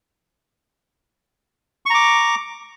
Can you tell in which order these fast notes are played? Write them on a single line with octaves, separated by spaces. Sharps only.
C#6 A#5 D6